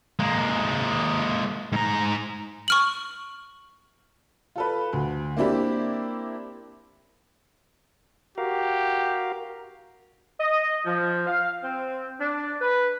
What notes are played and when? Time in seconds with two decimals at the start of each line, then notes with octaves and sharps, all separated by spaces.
0.19 G#3 A#3
1.72 G#2 A#5
2.68 C#6 F6 F#7
4.56 F4 A4 B4
4.93 D2
5.37 A#3 C4 D4 E4 G4
8.38 F#4 G4 A#4 F5
10.40 D#5
10.86 F3
11.27 F5
11.63 C4
12.20 D4
12.61 B4